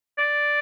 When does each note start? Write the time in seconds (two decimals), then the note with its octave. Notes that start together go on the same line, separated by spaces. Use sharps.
0.18 D5